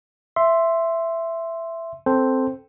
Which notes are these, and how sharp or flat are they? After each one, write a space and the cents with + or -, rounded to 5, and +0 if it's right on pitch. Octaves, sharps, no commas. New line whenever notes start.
E5 +10 C6 +0
C4 +0 A4 +0 C5 +0